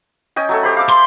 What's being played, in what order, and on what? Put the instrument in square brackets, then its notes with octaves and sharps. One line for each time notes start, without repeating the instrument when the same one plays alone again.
[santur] C#4 D#5 G5
F#3 A3 A4
G4 C5 B5
F5 D6 E6
[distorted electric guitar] C6